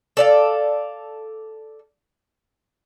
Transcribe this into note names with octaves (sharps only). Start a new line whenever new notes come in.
A4 D5 F5